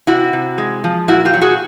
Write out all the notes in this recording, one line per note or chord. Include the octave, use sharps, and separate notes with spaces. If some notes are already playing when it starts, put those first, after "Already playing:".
C3 E4 F#4
C3
G#3
F3
A#2 E4 F#4
F4 G4
F#3
F#4 G#4